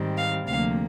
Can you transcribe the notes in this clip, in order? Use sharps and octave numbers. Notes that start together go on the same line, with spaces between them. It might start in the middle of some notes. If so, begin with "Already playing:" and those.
Already playing: G#2 D#3 G3 C4
F5
D2 C3 F3 A#3 F5